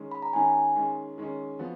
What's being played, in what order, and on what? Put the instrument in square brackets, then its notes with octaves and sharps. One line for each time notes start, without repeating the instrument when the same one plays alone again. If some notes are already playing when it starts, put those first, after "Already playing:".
Already playing: [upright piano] D#3 G#3 C#4
[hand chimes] B5
A#5
[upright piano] D#3 G#3 C#4 [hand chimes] G#5
[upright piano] D#3 G#3 C#4
D#3 G#3 C#4
F3 B3 F#4